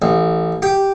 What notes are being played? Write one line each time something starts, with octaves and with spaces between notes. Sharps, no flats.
A1
G4